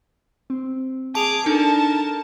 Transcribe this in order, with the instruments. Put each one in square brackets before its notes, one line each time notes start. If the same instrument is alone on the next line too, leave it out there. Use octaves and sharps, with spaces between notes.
[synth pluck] C4
[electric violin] G#4 D6 [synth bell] A5 F7
[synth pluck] D4 A4 [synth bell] D#4 [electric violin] A#4 A5